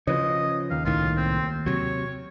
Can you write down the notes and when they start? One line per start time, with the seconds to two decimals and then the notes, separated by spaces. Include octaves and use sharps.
0.07 C#3 F3 F4 B4 C#5 D#5
0.71 D#2 F5
0.85 C2 A2 D#3 F4
1.17 C4
1.66 C3 F#3 C#5